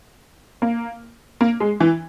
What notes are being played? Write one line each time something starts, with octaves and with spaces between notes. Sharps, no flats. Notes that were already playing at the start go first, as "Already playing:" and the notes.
A#3
A#3
G#3
E3